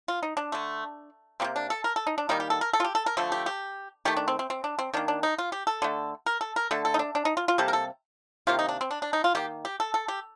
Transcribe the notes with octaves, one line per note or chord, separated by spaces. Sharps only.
F4
D#4
D4
D3 A3
C3 G3 A#3 C4
D4
A4
A#4
A4
D#4
D4
D#3 G3 A#3 D#4
G4
A4
A#4
A4
F4
G4
A4
A#4
D3 F3 A3 A4
G4
G4
D#3 A3 G4
D4
C4
C4
C4
D4
C4
D#3 A#3 D4
D4
D#4
F4
G4
A4
D3 A3
A#4
A4
A#4
D3 A3 A4
A4
D#4
D4
D4
D#4
F4
F4
C3 G3 A#3 A4
A#4
A4
C3 D#3 A#3 F4
D#4
D4
C4
D4
D4
D#4
F4
D#3 A#3 G4
G4
A4
A4
G4